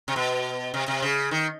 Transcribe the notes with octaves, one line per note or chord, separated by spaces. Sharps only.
C3
B2
C3
C3
C#3
D#3